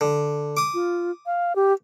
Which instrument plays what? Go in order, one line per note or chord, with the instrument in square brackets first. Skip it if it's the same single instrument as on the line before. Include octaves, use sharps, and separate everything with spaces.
[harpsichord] D3
D6 D#6
[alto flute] F4
F5
G4